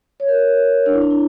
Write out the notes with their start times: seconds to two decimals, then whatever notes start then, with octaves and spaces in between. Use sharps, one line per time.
0.20 C#5
0.28 A#4
0.86 D4
0.94 E4
1.02 D4
1.11 E4